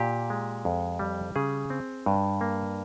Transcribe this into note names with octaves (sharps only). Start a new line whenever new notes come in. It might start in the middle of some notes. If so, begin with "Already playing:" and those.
Already playing: A#2 G4
G#3
F2
G3
C#3 G#4
C4
G2
A#3